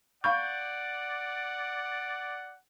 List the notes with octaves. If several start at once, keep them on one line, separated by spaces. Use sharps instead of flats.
D5 F5 F#5 B5 C#6 G6